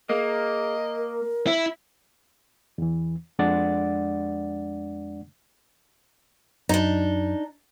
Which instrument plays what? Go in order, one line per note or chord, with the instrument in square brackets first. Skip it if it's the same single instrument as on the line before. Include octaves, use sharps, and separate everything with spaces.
[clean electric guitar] A#3 [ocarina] G#4 [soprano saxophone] D#5
[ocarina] A#4
[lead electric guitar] E4
[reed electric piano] E2 E3
F2 G#3 D4 D5 F#5 A6
[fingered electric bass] F#2 [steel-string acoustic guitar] D4 D#4